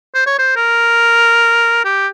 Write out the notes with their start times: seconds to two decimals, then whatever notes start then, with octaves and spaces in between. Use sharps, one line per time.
0.15 C5
0.26 C#5
0.39 C5
0.56 A#4
1.85 G4